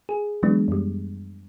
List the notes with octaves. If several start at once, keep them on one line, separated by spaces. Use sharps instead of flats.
G#4
E3 F#3 G#3 B3 D4
F#2 G3